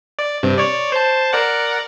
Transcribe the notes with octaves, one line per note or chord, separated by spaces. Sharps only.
D5
G2 C3
C#5 D5
C5 A5
A#4 D5 F#5